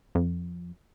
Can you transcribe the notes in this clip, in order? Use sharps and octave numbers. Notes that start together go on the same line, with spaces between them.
F2